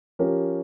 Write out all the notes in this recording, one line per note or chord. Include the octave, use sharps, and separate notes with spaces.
F3 C#4 G4 A#4